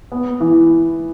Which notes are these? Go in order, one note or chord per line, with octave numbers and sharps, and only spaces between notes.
B3
E3